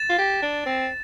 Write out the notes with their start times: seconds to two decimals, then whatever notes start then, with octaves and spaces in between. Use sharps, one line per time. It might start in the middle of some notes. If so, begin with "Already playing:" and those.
Already playing: A6 E7
0.10 F4
0.18 G4
0.42 D4
0.66 C4